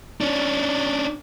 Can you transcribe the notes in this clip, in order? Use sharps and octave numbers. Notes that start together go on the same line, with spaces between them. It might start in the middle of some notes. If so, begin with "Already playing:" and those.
C#4 D4